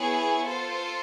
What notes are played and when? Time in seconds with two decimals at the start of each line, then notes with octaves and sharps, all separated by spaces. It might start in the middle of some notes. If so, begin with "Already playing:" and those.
Already playing: B3 E4 G#4 C#5
0.45 F4 A4 C5